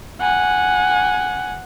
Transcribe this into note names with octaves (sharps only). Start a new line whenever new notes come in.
F#5 G#5